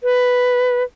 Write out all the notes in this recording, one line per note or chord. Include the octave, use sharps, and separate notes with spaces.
B4